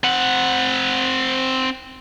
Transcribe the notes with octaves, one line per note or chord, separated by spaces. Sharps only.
C4 F#5